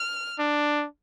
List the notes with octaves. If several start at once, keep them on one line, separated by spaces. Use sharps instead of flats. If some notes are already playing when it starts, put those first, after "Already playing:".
Already playing: F6
D4